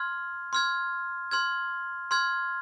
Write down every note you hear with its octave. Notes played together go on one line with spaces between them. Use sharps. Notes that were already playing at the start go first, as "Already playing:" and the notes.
Already playing: C6 F6 G#6
C6 F6 G#6
C6 F6 G#6
C6 F6 G#6